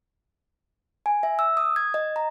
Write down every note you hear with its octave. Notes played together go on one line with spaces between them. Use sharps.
G#5
E5
E6
D#6
G#6
D#5
A#5